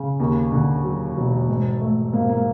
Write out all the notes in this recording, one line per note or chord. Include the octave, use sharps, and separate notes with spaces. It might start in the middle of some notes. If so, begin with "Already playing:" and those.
Already playing: C#3
D#2
D3
F#3
E1
G#2
A3
G#2 A#3
A#3